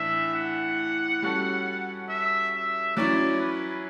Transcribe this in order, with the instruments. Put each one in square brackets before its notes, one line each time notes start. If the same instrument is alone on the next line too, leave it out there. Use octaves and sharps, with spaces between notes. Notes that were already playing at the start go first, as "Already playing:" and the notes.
Already playing: [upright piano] A2 E3 D4 [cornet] E5
[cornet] F#5
[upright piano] G3 C#4 F#4 A4
[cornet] E5
E5
[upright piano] F#3 C#4 E4 [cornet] D5
[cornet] B4